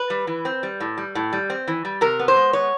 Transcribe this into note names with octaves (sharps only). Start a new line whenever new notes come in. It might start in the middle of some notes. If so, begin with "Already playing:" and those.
Already playing: B4
G3
E3
C4
G3
A2
G3
A2
G3
C4
E3
G3
C3 A#4
B3
C5
G#3
B3 C#5